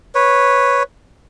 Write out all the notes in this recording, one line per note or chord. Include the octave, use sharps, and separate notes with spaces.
B4 C#5